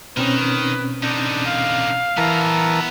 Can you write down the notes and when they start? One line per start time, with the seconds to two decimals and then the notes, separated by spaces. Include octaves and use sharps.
0.17 B2 D#3 C4 C#4 B4
1.03 D3 D4 D#4
1.46 F5
2.17 E3 B3 A#4 A5 A#5